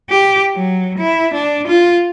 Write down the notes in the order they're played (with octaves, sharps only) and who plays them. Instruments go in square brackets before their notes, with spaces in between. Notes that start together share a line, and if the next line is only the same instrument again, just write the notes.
[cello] G4
F#3
E4
D4
F4